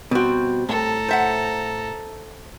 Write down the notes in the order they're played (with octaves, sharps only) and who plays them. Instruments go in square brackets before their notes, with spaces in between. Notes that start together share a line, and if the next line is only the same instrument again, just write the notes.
[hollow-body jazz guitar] B2 F#4 [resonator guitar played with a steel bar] G3 C4
[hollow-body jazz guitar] A2 [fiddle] A4 A#5
[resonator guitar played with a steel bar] C5 E5 F#5